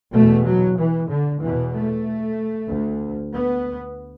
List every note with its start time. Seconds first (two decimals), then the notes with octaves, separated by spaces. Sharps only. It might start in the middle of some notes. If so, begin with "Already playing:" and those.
0.13 E2 B2 A3
0.45 F#3
0.77 E3
1.10 D3
1.41 E2 B2 E3
1.73 A3
2.68 D2
3.32 B3